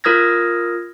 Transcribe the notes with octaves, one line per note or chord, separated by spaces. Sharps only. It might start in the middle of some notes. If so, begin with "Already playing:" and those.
F4 A#4 D#6 F6 G#6 A#6